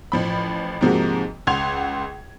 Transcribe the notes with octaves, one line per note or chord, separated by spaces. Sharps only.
A1 F3 B5
G#2 C3 F3 G#3 A#3 F#4
C#2 F#5 C6 G#6 F7